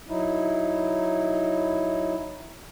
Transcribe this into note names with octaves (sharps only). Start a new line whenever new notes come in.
F#3 D#4 E4